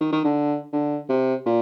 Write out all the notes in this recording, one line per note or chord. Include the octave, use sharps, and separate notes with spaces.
D#3
D#3
D3
D3
C3
A#2